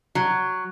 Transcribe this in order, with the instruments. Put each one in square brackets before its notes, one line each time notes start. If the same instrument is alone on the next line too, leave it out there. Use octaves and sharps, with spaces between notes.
[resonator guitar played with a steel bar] F#3